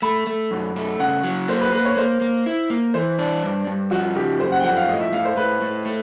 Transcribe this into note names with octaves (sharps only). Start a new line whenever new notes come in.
A3 B5
A3
F#2
A3
C#3 F#5
F#3
A#3 C5
B4
A#3 B4
C#5
A#3 C5
A#3
E4
A#3
E3 C5
D4
G2
G2
F3 F#4
C#3 G4
F#2 C5
F#5
G5
F3 F#5
F5
A2 D#5
E5
A2 F5
C5
A2 B4
A2
A3